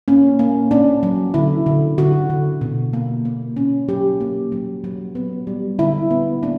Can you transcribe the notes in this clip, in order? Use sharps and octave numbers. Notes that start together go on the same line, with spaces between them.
A#3 C#4
A#3
C#4 D4
F#3
D3 E4
D3
D3 F#4
D3
B2
A#3
A#3
C#4
F#3 G4
A#3
F#3
F#3
B3
G3
D3 E4
B3
A#3 D4